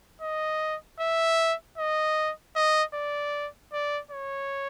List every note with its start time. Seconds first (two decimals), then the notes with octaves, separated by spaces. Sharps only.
0.22 D#5
1.00 E5
1.78 D#5
2.56 D#5
2.94 D5
3.73 D5
4.11 C#5